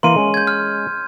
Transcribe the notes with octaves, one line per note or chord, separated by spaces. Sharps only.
E3 A#3 A#4 C6 D#7
G#3 C#4
G6 G#6
F6